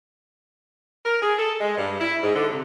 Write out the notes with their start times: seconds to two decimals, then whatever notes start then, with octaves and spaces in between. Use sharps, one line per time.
1.05 A#4
1.21 G#4
1.37 A4
1.60 G#3
1.78 G2
1.99 E4
2.23 G#2
2.35 D3
2.49 C3